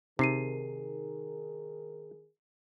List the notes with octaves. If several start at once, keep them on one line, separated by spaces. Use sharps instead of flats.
C3 D#3 D#4 G#4 A#4 C7 D#7